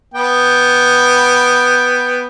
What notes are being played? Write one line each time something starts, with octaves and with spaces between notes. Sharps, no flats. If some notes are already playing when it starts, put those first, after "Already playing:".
B3 G5